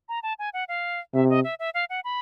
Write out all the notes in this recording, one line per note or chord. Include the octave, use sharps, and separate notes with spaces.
A#5
A5
G#5
F#5
F5
C3 E5
D#5
E5
E5
F5
F#5
B5